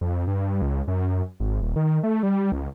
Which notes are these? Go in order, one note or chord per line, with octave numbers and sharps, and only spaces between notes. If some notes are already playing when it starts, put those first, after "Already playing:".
F2
G2
C#2
F#2
G#1
D#1
D#3
A3
G3
C#2